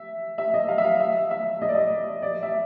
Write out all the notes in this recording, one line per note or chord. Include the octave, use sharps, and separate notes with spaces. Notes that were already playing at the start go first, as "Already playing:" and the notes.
Already playing: E5
E5
D#5
F5
E5
F5
E5
E5
D#5
D5
D#5
D5
E5